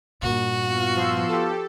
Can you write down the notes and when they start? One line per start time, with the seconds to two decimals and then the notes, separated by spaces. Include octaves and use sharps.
0.22 G2 A#2 F#4
0.68 B3 F4
0.96 F3 C6 E6
1.29 G4 A4